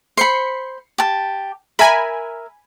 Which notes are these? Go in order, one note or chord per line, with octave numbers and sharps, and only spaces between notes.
C5 B5 C7 C#7
G4 A5
A#4 E5 G#5 B5